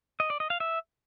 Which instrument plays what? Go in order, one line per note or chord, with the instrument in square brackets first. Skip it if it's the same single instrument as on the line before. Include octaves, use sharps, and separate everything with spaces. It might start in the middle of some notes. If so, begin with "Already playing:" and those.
[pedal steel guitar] D#5
D5
D#5
F5
E5